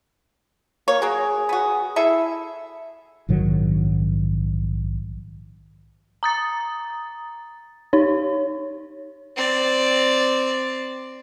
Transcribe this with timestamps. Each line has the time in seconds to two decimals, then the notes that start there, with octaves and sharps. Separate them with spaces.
0.88 A#3 C#5
1.02 F#3 A#3 G#4
1.49 B3 F#4
1.96 E4 G#4 A4 E5
3.29 A#1 G#2 D#3 F#3
6.23 A#5 D#6 A6
7.93 D#4 C#5
9.36 C4 D5